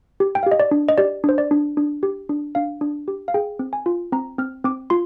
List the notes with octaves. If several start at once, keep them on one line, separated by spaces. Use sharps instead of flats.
G4
G5
F5
G4
D#5
D5
D4
D#5
G4 D5
D4 C5
D5
D4
D4
G4
D4
D4 F5
D4
G4
F5
G#4 G5
C4
G#5
F4
C4 A#5
C4 F6
C4 D6
F4 C6